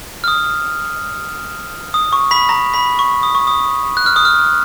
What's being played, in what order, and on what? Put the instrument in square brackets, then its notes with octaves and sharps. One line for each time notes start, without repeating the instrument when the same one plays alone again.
[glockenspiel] F6
D#6
D#6
C#6
B5 B6
A#5 A#6
B5 B6
C#6
D#6
C#6
D#6
F#6
F6
D#6
F6